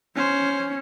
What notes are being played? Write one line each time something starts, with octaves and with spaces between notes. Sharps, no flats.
C#4 C5